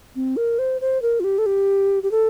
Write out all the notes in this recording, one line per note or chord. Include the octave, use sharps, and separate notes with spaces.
C4
A#4
C5
C5
A#4
F4
G4
A4
G4
G4
A4